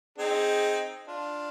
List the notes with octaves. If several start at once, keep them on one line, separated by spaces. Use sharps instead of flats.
C4 D#4 G#4
D4 F4